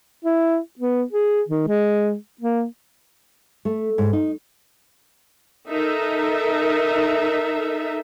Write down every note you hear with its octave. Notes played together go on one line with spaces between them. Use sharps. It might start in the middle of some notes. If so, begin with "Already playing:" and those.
E4
B3
G#4
D#3
G#3
A#3
A3
G#2
D#4
D#4 A4 A#4 E5